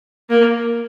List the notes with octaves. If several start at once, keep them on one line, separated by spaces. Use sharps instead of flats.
A#3